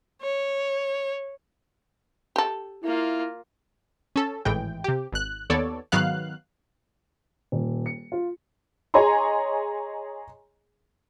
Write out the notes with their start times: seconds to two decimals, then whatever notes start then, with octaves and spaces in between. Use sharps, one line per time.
0.22 C#5
2.36 G4 A4
2.83 A#3 E4 F4
4.16 C#4 A4
4.45 G#1 A2 E3 G#3 G5
4.84 C3 G4
5.13 G#1 F#6
5.50 D#2 B3 A4 C#5 D5
5.92 G#2 D#3 F#3 B3 F5 F#6
7.52 D#1
7.86 C#7
8.12 F4
8.94 G#4 C#5 D#5 G#5 A#5 C6